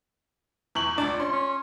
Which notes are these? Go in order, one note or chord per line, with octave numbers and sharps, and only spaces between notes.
E2 C#6 F#7
C#2 D4 D5
C#4 C6
C#4